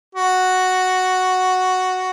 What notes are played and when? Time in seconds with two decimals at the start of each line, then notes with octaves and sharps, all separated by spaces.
0.15 F#4